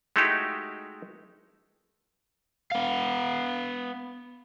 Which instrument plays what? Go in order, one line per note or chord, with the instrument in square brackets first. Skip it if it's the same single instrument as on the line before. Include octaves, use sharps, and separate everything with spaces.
[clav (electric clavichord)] G#3 A3 D#4 E4 F#4 G4
[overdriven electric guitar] B3 F5